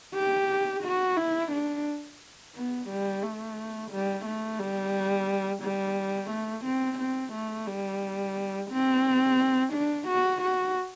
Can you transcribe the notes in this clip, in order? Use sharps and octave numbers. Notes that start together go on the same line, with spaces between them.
G4
F#4
E4
D4
B3
G3
A3
G3
A3
G3
G3
A3
C4
C4
A3
G3
C4
D4
F#4
F#4